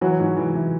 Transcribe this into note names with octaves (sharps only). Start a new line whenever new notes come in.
E3 F#3 F#4
G#2
E3
E3